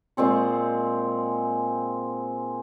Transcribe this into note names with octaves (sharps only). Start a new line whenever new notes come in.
A#2 G#3 C4 C#6